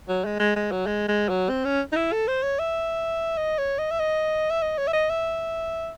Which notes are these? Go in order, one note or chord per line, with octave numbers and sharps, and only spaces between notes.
F#3
G#3
G#3
G#3
F#3
G#3
G#3
F#3
C4
C#4
D#4
E4
A4
C5
C#5
E5
D#5
C#5
D#5
E5
D#5
E5
D#5
C#5
E5
D#5
E5